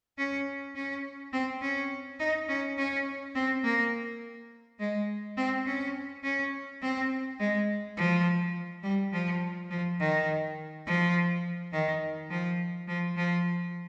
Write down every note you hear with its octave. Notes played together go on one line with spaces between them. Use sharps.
C#4
C#4
C4
C#4
D#4
C#4
C#4
C4
A#3
G#3
C4
C#4
C#4
C4
G#3
F3
G3
F3
F3
D#3
F3
D#3
F3
F3
F3